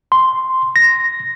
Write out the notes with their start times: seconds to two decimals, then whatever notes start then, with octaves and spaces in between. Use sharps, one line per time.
0.12 C6
0.76 A#6